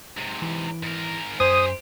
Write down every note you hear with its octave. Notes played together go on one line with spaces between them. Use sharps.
G#2 C3
E3
G#2 A#4
F#2 G4 C5 G#5 D#6